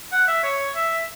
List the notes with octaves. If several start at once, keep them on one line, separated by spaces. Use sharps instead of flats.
F#5
E5
C#5
E5